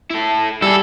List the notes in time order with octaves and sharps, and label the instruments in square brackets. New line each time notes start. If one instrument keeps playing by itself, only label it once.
[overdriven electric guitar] E4 A4
[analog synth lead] G3 [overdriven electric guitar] E4 G#4 [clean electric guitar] A4